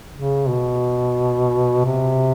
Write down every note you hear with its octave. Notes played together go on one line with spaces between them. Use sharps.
C#3
B2
C3